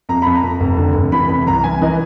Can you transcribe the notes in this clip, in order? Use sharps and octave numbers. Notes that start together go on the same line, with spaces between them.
F2 A#5
F2 B5
A#5
F2
F1
D3
F1
E3 B5
C3 B5
C2 A#5
E3 G#5
E3 D#5